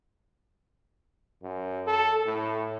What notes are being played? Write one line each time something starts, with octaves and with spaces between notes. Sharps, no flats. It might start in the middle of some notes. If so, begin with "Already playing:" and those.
F#2
A4
A2